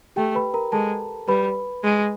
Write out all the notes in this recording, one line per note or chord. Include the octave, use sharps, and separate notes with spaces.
A3 G4 G5
B4 B5
A#4 A#5
G#3 A4 A5
G3 B4 B5
G#3